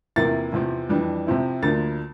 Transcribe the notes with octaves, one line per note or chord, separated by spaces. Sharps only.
E2 C3 F3 A#3 E4 A6
E2 C3 F3 C4
F2 E3 G3 D4
C3 F3 C4 E4
D2 D3 F3 A#3 A6